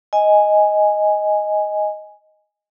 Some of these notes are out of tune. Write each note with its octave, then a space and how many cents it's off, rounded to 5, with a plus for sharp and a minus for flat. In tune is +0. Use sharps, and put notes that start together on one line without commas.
D#5 +5 G#5 +0